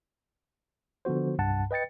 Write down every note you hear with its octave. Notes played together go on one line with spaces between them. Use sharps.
D3 F3 B3 F#4 C5
C2 G2 F#5 A5
B4 D#5 G5 A6 C#7